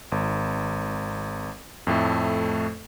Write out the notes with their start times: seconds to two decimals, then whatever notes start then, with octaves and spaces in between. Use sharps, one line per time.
0.12 G#1
1.87 F2 A2 A3 A4